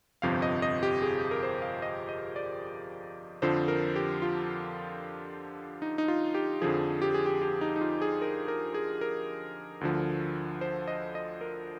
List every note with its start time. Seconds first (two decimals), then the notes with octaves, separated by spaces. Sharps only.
0.22 G1 F2 C3 F3 F5
0.42 D#5
0.62 D#5
0.83 G4
1.02 G#4
1.31 A#4
1.43 C5
1.62 F5
1.82 D#5
2.09 D#5
2.36 D5
3.42 F2 D3 F3 C5
3.68 A#4
3.96 G4
4.22 F4
5.82 D#4
5.98 D#4
6.08 F4
6.35 G4
6.62 F2 D3 F3 G#4
7.02 G4
7.14 G#4
7.26 G4
7.42 G4
7.61 D#4
7.76 D#4
7.81 F4
8.02 G#4
8.22 A#4
8.48 A#4
8.74 G#4
9.01 A#4
9.81 D2 D3 F3
10.61 C5
10.88 D#5
11.15 D#5
11.41 A#4